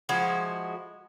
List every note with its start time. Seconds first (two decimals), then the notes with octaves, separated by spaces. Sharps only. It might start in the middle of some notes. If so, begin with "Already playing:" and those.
0.09 F3 G#3 E4 F#4